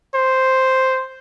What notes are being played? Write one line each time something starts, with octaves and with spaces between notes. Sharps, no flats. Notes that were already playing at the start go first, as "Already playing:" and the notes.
C5